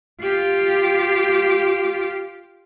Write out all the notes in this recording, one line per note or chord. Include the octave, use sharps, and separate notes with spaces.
F4 G4